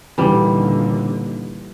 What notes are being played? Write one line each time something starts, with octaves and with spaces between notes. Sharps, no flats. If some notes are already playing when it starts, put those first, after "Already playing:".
D#2 A#2 D3 E3 G3